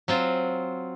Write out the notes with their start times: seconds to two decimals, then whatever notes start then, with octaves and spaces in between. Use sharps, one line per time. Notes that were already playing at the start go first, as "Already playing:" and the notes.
0.08 F#3 C4 F4